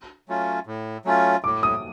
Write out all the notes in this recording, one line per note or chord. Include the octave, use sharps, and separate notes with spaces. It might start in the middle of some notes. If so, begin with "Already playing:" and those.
F#3 A3 C#4 F4
A2
F#3 A3 C#4 F4
A2 D6
D#6